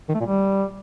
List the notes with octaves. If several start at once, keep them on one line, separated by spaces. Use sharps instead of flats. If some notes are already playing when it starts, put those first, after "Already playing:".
D#3
A3
A#2
G3